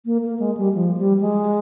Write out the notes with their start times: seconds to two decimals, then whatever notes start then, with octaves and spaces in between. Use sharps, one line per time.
0.05 A#3
0.23 A#3
0.39 G#3
0.57 G3
0.75 F3
0.97 G3
1.21 G#3